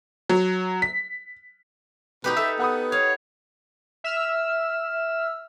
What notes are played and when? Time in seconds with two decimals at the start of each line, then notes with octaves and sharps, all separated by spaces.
0.29 F#3
0.82 B6
2.24 B2 D#4 G4 B4
2.37 A4 E5
2.60 B3 F#5 B5 D#6
2.92 C#5 F5
4.04 E5 E6 F6